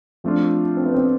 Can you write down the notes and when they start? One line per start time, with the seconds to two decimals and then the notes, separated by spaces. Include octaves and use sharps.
0.24 F3 A3 C4 D4 F4
0.77 C4
0.86 B3
0.94 C4